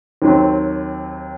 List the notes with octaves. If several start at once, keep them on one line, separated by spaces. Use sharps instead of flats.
D#2 D#3 F#3 C4